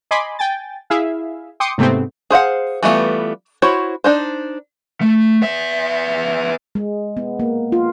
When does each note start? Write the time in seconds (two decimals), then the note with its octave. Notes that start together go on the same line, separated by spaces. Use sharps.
0.11 D#5 G#5 B5 C6 D6
0.39 G5 G#5 A6
0.90 E4 G#4 E5 F5
1.60 G5 C6 D6 D#6 C#7
1.78 G#2 C3 A3 B3 C4
2.30 G#4 C5 F5 F#5
2.83 E3 G3 A3 B3 F4
3.62 E4 F#4 C5 C#5
4.04 D4 D#4 C5
5.01 A3
5.42 B3 E5
6.75 G#3
7.17 B3
7.40 A#3
7.72 F4